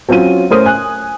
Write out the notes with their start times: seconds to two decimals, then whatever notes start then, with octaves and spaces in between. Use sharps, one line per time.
0.09 F#3 C4 C#4 F4 D#7
0.51 A2 C#4 A#4 C5 D#6 D#7
0.66 G#5 F#6